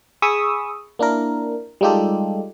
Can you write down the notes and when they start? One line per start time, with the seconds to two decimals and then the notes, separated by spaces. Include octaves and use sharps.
0.22 G#4 B5 C#6 D#6 E6
0.99 A#3 D4 E4 A#4
1.81 G3 G#3 D#4 F4 G4 A4